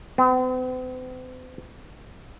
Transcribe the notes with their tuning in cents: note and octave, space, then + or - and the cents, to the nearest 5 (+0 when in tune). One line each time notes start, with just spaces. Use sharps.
C4 -45